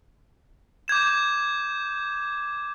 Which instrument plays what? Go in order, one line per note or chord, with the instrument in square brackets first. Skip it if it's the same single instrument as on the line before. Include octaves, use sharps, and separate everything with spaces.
[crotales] D6 G6 G#6 E7